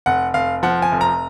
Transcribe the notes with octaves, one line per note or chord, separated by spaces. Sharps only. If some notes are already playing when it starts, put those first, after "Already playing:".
F1 F#5
F1 F5
F3 F#5
G#5
F1
A#5